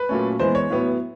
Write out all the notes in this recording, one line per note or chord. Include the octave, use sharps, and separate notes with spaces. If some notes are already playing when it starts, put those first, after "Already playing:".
Already playing: B4
A#2 F#3 A3 C#4
E3 G#3 B3 C5
C#5
A2 F#3 B3